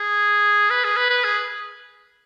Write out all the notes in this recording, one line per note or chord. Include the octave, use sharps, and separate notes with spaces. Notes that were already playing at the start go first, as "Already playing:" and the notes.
Already playing: G#4
B4
G#4
B4
B4
G#4